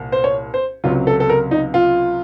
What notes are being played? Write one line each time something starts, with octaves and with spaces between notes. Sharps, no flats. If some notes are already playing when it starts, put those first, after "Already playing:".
Already playing: C2 A#2
C5
C#5
C5
C#2 C3 F#3 F4
A4
A4
A#4
D#4
F4